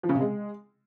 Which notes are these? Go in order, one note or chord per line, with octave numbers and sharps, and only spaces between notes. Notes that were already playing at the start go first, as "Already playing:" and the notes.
F3
C#3
C3
G#3